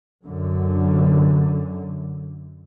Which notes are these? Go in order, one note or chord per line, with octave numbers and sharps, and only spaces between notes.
F#2 D3